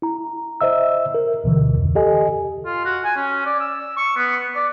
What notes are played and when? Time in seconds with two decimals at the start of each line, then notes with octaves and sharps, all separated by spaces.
0.02 E4 A#5
0.61 C5 D#5 E5 E6
1.14 A#4
1.44 D2 B2 D3 E3
1.78 F2
1.95 G4 A4 D#5 G#5
2.66 F4
2.85 F#4
3.05 G#5
3.17 C#4
3.46 D5
3.60 E6
3.97 C#6
4.17 B3
4.56 D5